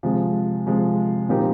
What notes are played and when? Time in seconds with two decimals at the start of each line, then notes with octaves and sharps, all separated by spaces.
0.03 C3 F3 G#3
0.66 C3 F3 G#3
1.29 A#2 F3 C4 D#4 G4